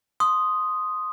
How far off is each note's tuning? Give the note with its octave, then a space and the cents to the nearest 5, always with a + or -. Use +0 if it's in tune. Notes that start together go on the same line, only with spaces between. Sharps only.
C6 +0 D#6 +0